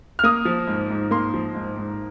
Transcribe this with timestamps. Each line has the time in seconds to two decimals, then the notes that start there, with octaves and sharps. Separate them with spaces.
0.19 F6
0.24 A#3 D#6
0.45 F3
0.67 G#2
0.90 G#2
1.11 A#3 C6
1.34 F3
1.55 G#2
1.77 G#2